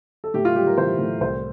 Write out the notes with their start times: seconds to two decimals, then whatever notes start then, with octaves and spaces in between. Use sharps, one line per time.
0.24 A4
0.34 A2 G4
0.45 F4
0.56 G3 G4
0.67 A#4
0.77 E3 C5
0.99 A2
1.21 C2 C5